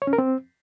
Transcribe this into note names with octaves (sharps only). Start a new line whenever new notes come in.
C#5
C#4
A#4
C4